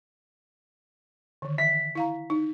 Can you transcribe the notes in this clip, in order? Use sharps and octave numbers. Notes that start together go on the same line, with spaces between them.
D3 D#3
E3 E5 B6
E4 F5 A#5
D#4